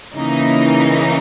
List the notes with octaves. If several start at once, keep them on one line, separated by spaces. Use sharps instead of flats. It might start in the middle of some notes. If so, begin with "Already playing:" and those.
C#3 E3 A#3 D#4